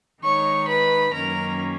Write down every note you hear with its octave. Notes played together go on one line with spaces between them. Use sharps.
D#3 G#3 D#4 C#5 C#6
B4 B5
F#2 D#3 F#3 A#3 C#4 A#4 A#5